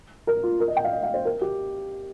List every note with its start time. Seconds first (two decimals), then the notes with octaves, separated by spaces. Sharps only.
0.27 A#4
0.43 F4
0.60 A#4
0.68 D#5
0.77 G5
0.84 F5
0.92 D#5
1.03 F5
1.14 C5
1.25 A#4
1.41 G4